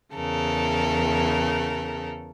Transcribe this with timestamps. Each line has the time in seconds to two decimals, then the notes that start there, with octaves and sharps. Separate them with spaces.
0.15 E2 C#3 A4 A#4